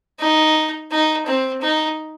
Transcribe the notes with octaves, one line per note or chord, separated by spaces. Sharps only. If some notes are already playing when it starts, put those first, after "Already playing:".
D#4
D#4
C4
D#4